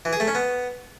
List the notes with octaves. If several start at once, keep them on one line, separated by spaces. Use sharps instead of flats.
E3
G#4
A3
C#4
B3